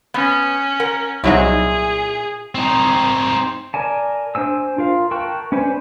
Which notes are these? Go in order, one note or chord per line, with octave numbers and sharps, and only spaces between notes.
B3 C#4
A#4 F#5
C2 A#2 F#3 D#4 E4 G#4
C4 D#4
A#4 D5 G#5 A5
D4 C5 G#5 E6
F4 A#4 F5
A#4 G5 A5 C#6 F#6
C#4 D4 B4 C5 G#5